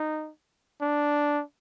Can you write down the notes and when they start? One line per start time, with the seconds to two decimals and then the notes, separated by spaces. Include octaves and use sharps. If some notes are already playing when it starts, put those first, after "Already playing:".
Already playing: D#4
0.81 D4